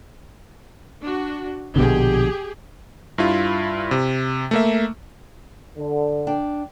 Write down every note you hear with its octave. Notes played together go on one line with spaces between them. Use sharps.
D4 F#4
A#1 B2 D3 G4 G#4
G2 E4 F4
C3
A3 A#3 E5
D3
D4 G5